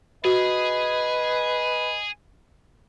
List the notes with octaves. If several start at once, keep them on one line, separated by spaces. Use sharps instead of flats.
F#4 G#4 B4 D#5